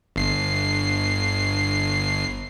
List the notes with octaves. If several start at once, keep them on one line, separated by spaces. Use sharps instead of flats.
G1 C7